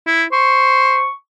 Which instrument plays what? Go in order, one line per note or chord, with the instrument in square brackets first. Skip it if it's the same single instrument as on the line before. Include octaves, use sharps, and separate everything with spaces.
[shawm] E4
[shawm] C5 [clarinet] C#6